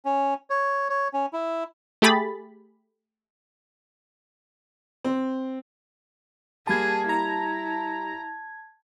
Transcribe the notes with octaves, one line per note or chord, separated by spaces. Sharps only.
C#4
C#5
C#5
C#4
E4
A3 G4 G#4 B5 A6
C4
G3 A#3 G#4 A5 B5 G#6
E4 A#5